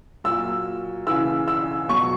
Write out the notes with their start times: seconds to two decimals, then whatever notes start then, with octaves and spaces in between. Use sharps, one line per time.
0.24 A#2 F#3 E6
1.07 C#3 E3 E6
1.48 E6
1.89 B2 F#3 C#6